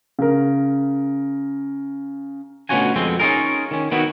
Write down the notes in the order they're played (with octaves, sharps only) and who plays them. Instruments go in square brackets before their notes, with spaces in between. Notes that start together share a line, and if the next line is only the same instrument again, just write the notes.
[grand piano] C#3 A#4
[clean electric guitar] D2 B2 C#4 F4 F#4 G#5
F2 B2 G#3 C4
C#4 D#4 F4 G#4 A#4
D#3 C#4
D#3 B3 D#4 E4 F#4